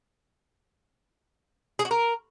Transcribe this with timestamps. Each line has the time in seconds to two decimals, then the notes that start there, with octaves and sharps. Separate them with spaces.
1.79 G#4
1.85 F#4
1.91 A#4